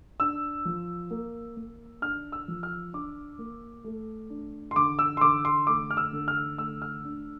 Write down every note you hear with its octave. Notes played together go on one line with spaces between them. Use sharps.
D4 E6
F3
A#3
A#3
D4 F6
E6
F3
F6
D4 D6
A#3
A3
D4
C6
D3 D6
E6
C6
D3 D6
C6
A3 D6
F6
E6
D3
F6
A3 E6
F6
D4